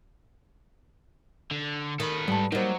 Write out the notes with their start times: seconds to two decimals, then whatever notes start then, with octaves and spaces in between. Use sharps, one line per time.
1.51 D3
2.00 D#3 A4 B4
2.28 G#2 G3 A5
2.52 F#3 G3 A#3 D#4 C5